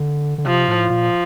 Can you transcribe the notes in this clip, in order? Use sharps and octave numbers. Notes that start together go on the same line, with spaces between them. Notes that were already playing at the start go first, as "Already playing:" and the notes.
Already playing: D3
D3
C3 F3
A2
A#2 F3